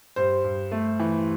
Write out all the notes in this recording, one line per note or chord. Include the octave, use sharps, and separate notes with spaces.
G2 C5
G2
A3
E3